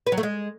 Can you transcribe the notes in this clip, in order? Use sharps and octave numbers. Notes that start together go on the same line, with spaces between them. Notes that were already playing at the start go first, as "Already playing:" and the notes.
B4
F#3
A3
G#3